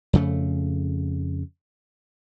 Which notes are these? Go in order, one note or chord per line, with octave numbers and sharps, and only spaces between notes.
F2 C#3 A3